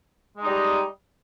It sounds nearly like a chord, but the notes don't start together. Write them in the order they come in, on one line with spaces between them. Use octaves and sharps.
G#3 D#4 G3